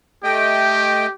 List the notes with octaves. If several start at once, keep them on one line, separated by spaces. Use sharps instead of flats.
A3 G4 D#5 G5